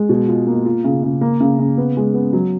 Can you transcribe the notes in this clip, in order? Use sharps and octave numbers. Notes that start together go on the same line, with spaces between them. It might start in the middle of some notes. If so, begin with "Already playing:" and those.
Already playing: G#3
B2
F4
A#3
F4
C#3
C#3
A#3
C#3
C#3
B3
G#3
B3
F#3